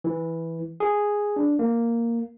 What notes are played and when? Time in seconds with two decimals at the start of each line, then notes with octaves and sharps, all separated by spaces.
0.04 E3
0.80 G#4
1.36 D4
1.59 A#3